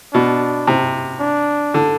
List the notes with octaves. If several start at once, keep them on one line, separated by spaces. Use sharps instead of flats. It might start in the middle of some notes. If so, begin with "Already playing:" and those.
B2 D4
C3
D4
D3